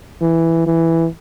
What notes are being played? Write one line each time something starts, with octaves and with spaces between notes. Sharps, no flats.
E3
E3